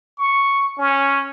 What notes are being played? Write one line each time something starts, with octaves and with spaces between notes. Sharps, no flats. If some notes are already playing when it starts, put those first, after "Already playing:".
C#6
C#4